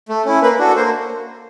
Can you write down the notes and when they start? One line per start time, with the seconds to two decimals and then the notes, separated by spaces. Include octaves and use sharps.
0.09 A3
0.25 C#4 E4
0.42 A#3 B4
0.59 D4 F#4 A4
0.76 A#3 C5